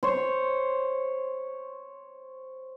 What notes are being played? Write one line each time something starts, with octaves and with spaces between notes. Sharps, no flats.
C5 C#5